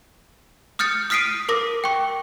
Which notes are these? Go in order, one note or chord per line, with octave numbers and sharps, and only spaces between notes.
D#6 F6 G6 A6 C#7
D#6 F6 B6 C7 D7 D#7
A#4 D6 A#6
G5 C#6